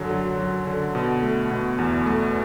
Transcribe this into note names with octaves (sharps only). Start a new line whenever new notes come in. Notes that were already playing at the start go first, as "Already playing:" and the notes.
Already playing: F#2 D3 F#3
F#3
F#3
D3
B2
A3
B2
E2
A3